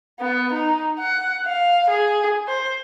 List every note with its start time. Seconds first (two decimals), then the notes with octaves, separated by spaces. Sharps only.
0.21 B3
0.53 D#4
0.99 F#5
1.47 F5
1.90 G#4
2.48 C5